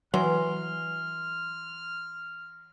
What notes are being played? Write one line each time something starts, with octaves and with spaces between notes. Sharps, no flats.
E3 F#3 C6 F6